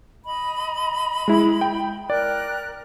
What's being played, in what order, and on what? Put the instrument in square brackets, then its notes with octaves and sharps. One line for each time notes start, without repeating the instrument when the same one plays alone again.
[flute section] D#5 B5
[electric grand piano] G#3 E4
G5
[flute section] A#4 G5 F#6 [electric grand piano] D5